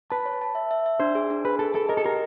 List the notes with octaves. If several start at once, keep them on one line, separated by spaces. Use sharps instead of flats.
B4 A5
C#5
A5
E5
E5
E5
D4 C5
G#4
D4
G#4 B4
G#4 A4
G#4 A4
A#4 D#5
A4
G4 A#4